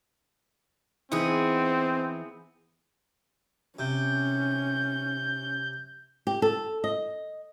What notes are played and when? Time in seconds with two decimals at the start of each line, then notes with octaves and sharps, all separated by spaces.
1.12 E3 B3 C4 D#4 E4 G#4
3.79 C3 C#4 G6
6.27 G4
6.42 A4
6.84 D#5